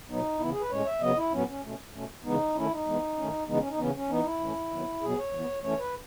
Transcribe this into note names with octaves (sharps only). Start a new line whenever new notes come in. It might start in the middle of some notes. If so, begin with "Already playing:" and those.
B2 F#3 B3 D#4
C#3 E3 B3 E4
G#4
B4
A2 G#3 C#4 C#5
E5
C#3 F#3 B3 D#5
E4
A2 F#3 B3 C#4
C#4
B2 A3 C#4
B2 A3 C#4
C#3 E3 G#3 B3 D#4
D#3 A3 C#4 E4
D#4
E3 G#3 B3
D#3 A3 C#4
C#3 E3 G#3 B3 D#4
C#4
D#4
C#3 E3 B3 C#4
C#4
E3 B3 D#4
E4
A2 E3 A3 C#4
D#3 F#3 B3
B2 F#3 B3 G#4
C#5
E3 B3
E3 A3 C#4 C#5
B4